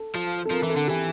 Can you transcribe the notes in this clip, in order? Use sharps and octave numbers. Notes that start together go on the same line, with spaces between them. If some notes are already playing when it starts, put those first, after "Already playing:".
Already playing: A4
F3
A4
F3 A#4
E3
A4
D3
G4
E3